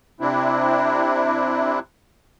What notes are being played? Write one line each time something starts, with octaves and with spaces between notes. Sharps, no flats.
C3 C4 D4 E4